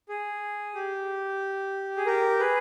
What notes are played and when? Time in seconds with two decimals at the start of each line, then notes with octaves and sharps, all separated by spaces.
0.09 G#4
0.74 G4
1.97 G#4
2.06 G4 A#4
2.39 G#4 B4